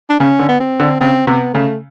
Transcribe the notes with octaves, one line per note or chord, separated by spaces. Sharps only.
D4
C#3 C#4
D3
B3
C4
D3
C#3 C4
C3 B3
C#3 A3